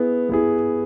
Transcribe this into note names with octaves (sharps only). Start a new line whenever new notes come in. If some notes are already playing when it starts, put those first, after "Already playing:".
Already playing: B3 E4 G#4
B3 E4 G#4